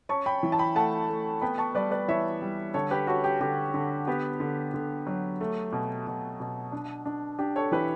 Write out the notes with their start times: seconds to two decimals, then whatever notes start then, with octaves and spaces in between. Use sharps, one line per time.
0.09 C#4 A5 C#6
0.26 G5 B5
0.43 E3
0.52 A5
0.59 G5 B5
0.75 A3 F#5 A5
1.09 A3
1.41 B3 G5 B5
1.58 A5 C#6
1.75 G3 B4 D5
1.91 B4 D5
2.08 E3 C#5 E5
2.42 G3
2.74 D3 A4 C#5
2.91 G4 B4
3.07 C#4 F#4 A4
3.24 G4
3.40 D3 G4
3.74 D3
4.07 B3 G4
4.40 D3
4.74 D3
5.07 F#3
5.41 A3
5.73 B2
6.07 B2
6.40 B2
6.72 D4
7.06 D4
7.39 D4 G4
7.56 A4 C#5
7.72 E3 G4 B4